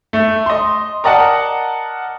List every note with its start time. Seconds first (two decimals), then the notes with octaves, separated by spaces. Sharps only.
0.13 A3
0.46 D#5 C6
1.04 A#4 D5 D#5 F#5 A5